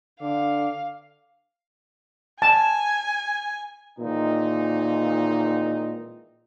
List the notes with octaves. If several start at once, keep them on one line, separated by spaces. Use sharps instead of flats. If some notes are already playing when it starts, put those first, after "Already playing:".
D3 F5 D6
G#5 A5
A#2 D#3 E3 G#3 C4 D#4